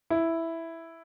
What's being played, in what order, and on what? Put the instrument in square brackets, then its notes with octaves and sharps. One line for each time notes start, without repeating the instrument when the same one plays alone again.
[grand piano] E4